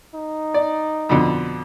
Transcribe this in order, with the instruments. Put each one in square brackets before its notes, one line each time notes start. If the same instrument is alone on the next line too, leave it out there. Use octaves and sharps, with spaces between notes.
[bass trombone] D#4
[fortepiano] D5
F2 B2 D3